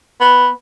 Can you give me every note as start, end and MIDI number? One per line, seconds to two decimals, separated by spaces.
0.20 0.48 59